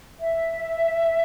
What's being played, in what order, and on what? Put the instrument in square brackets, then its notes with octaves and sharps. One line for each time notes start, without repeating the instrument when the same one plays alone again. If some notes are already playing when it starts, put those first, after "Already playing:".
[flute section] E5